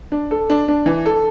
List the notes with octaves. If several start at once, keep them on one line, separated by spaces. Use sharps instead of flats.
D4
A4
D4
D4
E3
A4